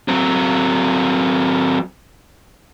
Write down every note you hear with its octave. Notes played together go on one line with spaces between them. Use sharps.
F#3 C4